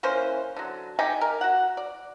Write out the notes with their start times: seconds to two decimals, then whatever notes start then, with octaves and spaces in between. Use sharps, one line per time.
0.03 E3 A#3 C#4 C5
0.56 D3 F#3
0.99 D3 D#4 G4 G#5
1.21 A#4
1.41 F#4 F#5
1.77 D5